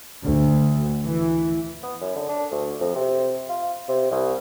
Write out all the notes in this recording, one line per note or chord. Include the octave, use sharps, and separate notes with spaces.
D2
E3
B3
F#2
D3
D4
D2
F2
C3
F4
C3
C2